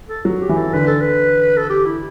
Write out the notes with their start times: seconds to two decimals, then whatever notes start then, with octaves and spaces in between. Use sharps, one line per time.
0.08 A4
0.25 F#3
0.41 G4
0.49 E3
0.57 A4
0.73 D3 B4
0.87 A4
1.01 B4
1.57 A4
1.70 G4
1.86 E4